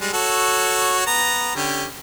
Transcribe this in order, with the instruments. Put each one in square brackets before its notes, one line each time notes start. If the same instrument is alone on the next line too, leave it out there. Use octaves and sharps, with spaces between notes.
[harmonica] G3 G#3
F#4 A4 C#5
B3 A#5
D3 C#4 G4